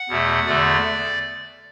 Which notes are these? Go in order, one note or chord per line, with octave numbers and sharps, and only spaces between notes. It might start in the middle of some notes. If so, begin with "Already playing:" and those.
Already playing: F#5
E2 B2 A3
E2 D3 A3 D5